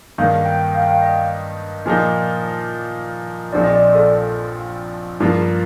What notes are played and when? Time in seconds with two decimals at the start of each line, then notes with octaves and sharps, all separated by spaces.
0.18 G2 D#3 A#3 D#4 F5
0.46 G5
0.74 F5
0.83 G5
0.91 F5
1.02 D#5
1.86 A#2 F3 A#3 D#4
3.53 A#1 A#2 F3 C4 D#4 D5
3.64 D#5
3.75 D5
3.95 A4
5.20 G2 F3 A#3 F4